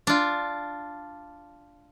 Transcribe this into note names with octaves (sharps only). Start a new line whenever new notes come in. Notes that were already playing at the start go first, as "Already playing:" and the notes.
D4 F4